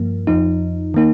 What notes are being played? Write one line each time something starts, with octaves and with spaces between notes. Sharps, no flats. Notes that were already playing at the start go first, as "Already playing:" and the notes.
Already playing: G2 F3 A#3
F2 F3 D#4
D#3 A#3 D#4